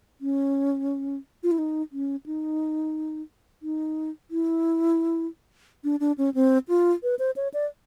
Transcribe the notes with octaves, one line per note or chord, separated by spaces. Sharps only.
C#4
F4
E4
D#4
C#4
D#4
D#4
E4
D4
D4
C#4
C4
F4
B4
C5
C#5
D5